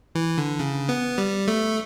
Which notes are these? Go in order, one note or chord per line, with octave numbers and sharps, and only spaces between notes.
E3
D3
C#3
B3
G3
A3